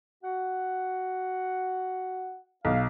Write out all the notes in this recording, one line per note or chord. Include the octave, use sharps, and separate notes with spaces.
F#4 F#5
B1 F5